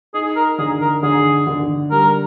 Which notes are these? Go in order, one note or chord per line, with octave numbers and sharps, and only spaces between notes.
D#4 G#4
A#4
D3 G#4
A#4
D3 G#4
D3
G3 A#4